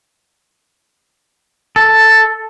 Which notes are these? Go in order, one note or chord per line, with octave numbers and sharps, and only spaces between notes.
A4